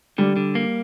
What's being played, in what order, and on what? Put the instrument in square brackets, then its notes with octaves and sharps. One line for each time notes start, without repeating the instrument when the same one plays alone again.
[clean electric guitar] D3 [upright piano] G3
[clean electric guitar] D3
A#3